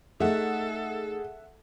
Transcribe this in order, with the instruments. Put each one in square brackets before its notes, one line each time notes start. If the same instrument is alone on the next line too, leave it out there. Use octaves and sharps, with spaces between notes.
[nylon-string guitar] A3 D#4 [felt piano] G#4 [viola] A4 [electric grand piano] E5 F#5